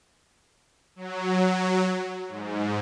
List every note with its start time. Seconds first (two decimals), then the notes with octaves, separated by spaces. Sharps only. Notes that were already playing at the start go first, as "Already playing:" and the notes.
0.96 F#3
2.28 G#2